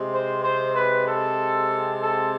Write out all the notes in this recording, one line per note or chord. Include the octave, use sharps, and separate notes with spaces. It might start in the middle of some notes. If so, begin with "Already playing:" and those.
Already playing: C3 G#3 C4
C5
C5
B4
A4
A4